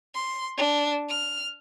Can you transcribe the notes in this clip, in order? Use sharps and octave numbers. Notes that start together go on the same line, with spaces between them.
C6
D4
F6